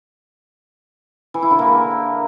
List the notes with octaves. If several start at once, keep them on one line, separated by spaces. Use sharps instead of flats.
E3
E4
D3
A#3